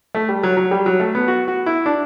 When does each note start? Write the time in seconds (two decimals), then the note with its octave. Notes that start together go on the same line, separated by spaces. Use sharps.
0.15 A3
0.29 G3
0.43 F#3
0.57 F#3
0.71 G3
0.86 F#3
1.00 A3
1.15 B3
1.28 F#4
1.48 F#4
1.66 E4
1.86 D4